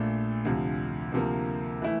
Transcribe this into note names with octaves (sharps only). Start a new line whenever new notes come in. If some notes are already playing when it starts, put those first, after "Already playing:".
Already playing: A#1 A#2 A3
D2 C3 F3
D2 C3 F3 A#3
E3 A3 E4